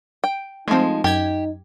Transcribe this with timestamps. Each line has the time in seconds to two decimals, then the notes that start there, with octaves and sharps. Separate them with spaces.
0.24 G5
0.68 F3 G#3 A3 C4 D#4
1.04 F#2 D#4 G4 G#6